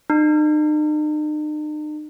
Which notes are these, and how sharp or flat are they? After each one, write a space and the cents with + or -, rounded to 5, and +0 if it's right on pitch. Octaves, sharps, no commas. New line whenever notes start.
D#4 -45